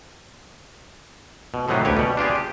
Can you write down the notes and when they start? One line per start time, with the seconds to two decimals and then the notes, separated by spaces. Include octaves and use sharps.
1.54 B2
1.68 A2 C3 D#3 F#3 B3 F4
1.85 D2 G4 B4 C#5
1.97 B2 G3
2.17 D4 F4 G4 G#4
2.36 G4